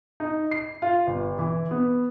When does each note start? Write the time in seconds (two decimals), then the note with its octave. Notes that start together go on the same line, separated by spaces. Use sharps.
0.20 D#4
0.51 C7
0.82 F4
1.07 G1
1.38 E3
1.71 B3